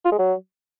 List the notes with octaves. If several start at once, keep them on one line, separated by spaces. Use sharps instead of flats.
F4
G#3
F#3